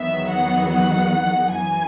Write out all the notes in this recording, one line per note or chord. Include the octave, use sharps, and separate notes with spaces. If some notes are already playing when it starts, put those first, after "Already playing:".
Already playing: E2 D#3 F#3 B3 E5
F#5
F#5
F#2 E3 G#5